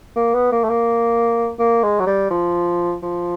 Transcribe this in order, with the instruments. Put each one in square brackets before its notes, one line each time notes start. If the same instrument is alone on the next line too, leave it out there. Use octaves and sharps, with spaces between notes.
[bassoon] A#3
B3
A#3
A3
A#3
A#3
G#3
F#3
G3
F3
F3